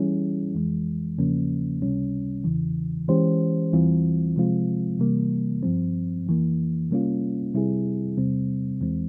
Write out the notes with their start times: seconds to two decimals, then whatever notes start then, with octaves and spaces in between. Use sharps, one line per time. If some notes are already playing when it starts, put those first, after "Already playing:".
Already playing: E3 G3 C#4 E4 G#4
0.54 F2 E3 G#3
1.18 E2 C#3 F3 A#3 C#4
1.81 C#2 C3 G3 C#4
2.44 E2 C#3 E3
3.08 E3 G#3 C#4 G4 C5
3.72 E2 E3 G3 C4 F4
4.36 C3 F3 G#3 C4 F4
5.00 C3 E3 G3 A#3
5.63 G2 F3 C4
6.27 F2 E3 A#3
6.90 C3 G3 A#3 C#4 F4
7.54 C3 G3 C4 E4 G#4
8.17 E2 C3 G3 C4
8.81 E2 E3 G#3 C4